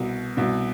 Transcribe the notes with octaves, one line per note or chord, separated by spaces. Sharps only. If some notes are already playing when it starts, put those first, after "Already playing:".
Already playing: C2 B2
C2 B2